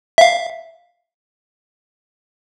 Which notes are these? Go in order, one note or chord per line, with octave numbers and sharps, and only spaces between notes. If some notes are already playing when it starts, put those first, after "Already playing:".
E5 F5